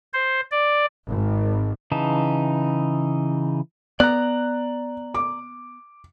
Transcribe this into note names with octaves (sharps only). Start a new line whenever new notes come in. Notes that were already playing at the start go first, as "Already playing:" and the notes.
C5
D5
G#1
C#3 E3 D#4 A5
B3 D5 A#5 F#6
D6